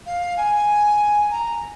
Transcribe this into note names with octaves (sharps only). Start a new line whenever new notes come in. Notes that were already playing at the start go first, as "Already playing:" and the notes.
F5
G#5
A#5